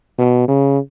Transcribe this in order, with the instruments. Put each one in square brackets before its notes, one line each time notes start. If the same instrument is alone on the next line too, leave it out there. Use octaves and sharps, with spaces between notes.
[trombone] B2
C#3